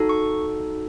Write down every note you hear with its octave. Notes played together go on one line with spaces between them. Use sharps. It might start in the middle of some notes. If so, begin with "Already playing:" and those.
Already playing: D#4 F#4 A4
C#6